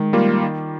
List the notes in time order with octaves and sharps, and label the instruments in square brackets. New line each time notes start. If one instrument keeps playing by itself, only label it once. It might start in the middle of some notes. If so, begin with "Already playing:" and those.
Already playing: [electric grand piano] D#3 [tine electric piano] G#3
[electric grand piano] G3 A#3 F4
D#3